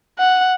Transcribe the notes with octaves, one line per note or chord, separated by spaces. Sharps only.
F#5